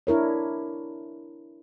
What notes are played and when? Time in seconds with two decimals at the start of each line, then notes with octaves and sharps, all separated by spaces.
0.07 D4 E4 A#4 C#5